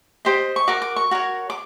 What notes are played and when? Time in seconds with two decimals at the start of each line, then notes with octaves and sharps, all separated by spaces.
0.25 G4 C5 D#5
0.56 C#6
0.67 F#4 A#4 D6
0.82 D6
0.96 C#6
1.11 F#4 A#4 C#5
1.50 D6